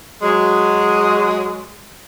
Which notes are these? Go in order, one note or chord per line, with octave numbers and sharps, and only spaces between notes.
F#3 G#3